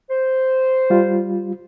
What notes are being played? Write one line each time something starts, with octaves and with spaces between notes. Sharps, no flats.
C5
G3 F4